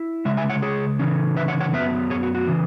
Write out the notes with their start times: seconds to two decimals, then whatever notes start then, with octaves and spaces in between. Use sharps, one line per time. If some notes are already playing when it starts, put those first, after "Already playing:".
Already playing: E4
0.25 C#3 G#3 E5
0.37 E5 G#5
0.50 C#5 F#5
0.62 G#4 C#5
0.99 C#3 E3 C#4
1.37 B4 E5
1.48 C#5 F#5
1.60 C#5 F#5
1.74 F#2 F#3 B3 B4 E5
2.10 G#4 C#5
2.23 F#4
2.35 F#4
2.47 C#3 E3